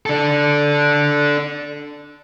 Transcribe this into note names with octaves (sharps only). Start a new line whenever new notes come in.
D4 A4